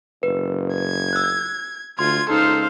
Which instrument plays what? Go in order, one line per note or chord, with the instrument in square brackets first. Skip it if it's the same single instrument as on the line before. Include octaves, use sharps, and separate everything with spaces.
[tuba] F#1 [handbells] B4
[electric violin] G#6
[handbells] E6 F#6
[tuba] D2 [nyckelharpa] F4 [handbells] C6 [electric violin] G#6
[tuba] C#2 [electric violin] D#4 A4 [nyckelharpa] C5 F5